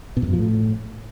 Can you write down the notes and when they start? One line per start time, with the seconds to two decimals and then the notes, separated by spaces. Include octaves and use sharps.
0.17 B2
0.22 E2
0.28 F#2
0.33 F3
0.39 A2